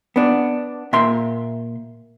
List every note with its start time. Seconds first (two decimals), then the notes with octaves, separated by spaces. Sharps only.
0.16 B3 D4
0.93 A#2 E5 C6